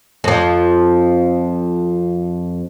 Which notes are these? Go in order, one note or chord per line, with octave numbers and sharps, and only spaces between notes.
F2 F3